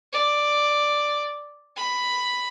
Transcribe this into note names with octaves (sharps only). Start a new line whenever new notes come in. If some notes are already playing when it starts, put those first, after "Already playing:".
D5
B5